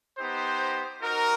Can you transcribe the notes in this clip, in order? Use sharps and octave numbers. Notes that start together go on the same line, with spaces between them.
B3 D#4 G4 C5
D#4 F#4 A#4